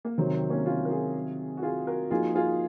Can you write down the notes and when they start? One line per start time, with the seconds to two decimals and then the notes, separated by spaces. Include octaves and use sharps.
0.05 A#3
0.18 C3 D#3 F#3 C4
0.34 C4
0.50 A#3 C#4
0.66 C#4 F4
0.85 A#4
0.90 F4 G#4
1.57 F#4
1.63 F4 G#4
1.87 F#4 A#4
2.11 F3 A#3 D#4 F4 F#4 G#4
2.34 F4 G#4